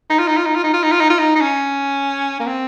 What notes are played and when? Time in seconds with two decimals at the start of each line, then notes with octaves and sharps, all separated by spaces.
0.10 D#4
0.19 F4
0.27 D#4
0.37 F4
0.46 D#4
0.55 F4
0.64 D#4
0.73 F4
0.83 D#4
0.92 F4
1.01 D#4
1.10 F4
1.19 D#4
1.35 D#4
1.41 C#4
2.40 A#3
2.47 C4